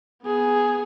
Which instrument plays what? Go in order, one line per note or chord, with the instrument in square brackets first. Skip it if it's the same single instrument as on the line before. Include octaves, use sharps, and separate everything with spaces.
[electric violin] B3 G#4